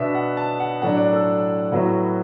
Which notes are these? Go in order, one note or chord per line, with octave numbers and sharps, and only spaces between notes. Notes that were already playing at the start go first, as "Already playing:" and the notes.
Already playing: B2 B3 D4 E5
F#5
A5
F#5
A2 F#3 D4 F#5
D5
A4
A2 F#3 B3 E4 F#4